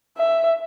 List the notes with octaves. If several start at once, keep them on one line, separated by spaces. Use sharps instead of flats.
E5